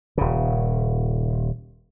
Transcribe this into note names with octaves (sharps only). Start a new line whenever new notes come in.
D#1 C#3